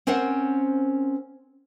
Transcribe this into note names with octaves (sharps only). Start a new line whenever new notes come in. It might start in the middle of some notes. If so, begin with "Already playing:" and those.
C4 C#4 A#4 C5 F#5